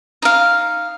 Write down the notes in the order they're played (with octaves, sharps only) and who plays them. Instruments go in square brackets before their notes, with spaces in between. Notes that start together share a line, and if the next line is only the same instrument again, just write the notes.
[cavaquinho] D#4 F5